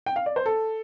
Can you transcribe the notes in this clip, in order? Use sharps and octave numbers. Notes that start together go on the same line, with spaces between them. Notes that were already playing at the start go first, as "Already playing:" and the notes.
G5
F5
D5
C5
A4